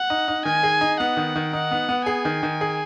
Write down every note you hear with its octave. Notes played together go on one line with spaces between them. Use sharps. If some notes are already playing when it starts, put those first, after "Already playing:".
Already playing: F#5
D#4
D#4
D#3 G#5
G#4
D#4
B3 F#5
D#3
D#3
D#4 F#5
B3
B3
G#4 G#5
D#3
D#3
G#4